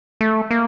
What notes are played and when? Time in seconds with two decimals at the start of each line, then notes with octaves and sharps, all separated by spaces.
0.21 A3
0.51 A#3